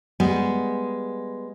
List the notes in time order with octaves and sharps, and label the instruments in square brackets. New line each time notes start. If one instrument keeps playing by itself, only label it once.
[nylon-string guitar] G3 G#3 B3